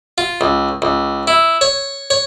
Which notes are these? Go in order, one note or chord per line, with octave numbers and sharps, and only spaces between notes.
F4
C#2
C#2
E4
C#5
C#5